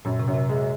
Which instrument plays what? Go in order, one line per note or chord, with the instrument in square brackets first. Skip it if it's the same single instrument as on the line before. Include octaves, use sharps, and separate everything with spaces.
[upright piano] F#2 [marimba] A#2
[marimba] C3
[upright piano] F#2
[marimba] C3
[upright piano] G#3